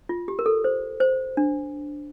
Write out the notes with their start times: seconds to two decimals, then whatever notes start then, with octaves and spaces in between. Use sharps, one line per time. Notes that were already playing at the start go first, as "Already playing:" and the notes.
0.09 F4
0.28 G4
0.39 A#4
0.46 A4
0.64 C5
1.00 C5
1.37 D4